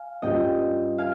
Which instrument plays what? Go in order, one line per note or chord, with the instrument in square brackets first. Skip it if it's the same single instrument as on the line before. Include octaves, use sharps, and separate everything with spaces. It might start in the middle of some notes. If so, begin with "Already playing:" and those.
Already playing: [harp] F5 G#5
[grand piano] G2 G3 C#4 F4 [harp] D#5 G5
[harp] F5 G#5